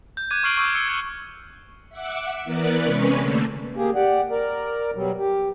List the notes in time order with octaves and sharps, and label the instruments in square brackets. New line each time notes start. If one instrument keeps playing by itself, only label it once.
[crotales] G6
D6 F#6 G#6 D#7
C#6 F6 G6 C7 D7 F#7
C#6 D6 E6 F6 G6
E6 C#7 G7
F#6 G#6 C#7 F#7
[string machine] E5 F#5 D6
E3 B3 A#4 B4 D5
C3 G#3 C#4 B4 C#6
D3 A3 A#3
[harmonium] A#3 G4 G#4
G4 D5 F#5
A#4 D5
B2 F#3 G3
G4